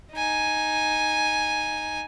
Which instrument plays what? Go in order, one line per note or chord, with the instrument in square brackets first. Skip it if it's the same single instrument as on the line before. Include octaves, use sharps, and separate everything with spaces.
[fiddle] D#4 G#5